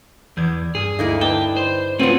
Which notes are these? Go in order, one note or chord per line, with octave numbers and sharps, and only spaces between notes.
E2 D5 G6 G#6
G2 G#4
D2 A#3 D#4 E4
B4 D5 D#5 G5 A5
C5
F3 F#3 A3 C4 B4 C#5